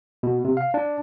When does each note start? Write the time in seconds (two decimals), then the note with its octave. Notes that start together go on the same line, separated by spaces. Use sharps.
0.23 B2
0.45 C3
0.57 F5
0.74 D4